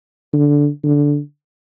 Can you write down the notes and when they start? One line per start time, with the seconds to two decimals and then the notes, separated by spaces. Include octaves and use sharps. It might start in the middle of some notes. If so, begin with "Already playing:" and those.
0.33 D3
0.83 D3